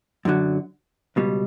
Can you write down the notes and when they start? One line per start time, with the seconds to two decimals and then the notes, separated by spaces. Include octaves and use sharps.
0.25 F#2 D3 F#3
1.16 C#2 B2 G3